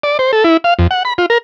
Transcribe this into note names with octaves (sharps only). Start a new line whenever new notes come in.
D5
C5
A4
E4
F5
F2
F#5
B5
F4
A#4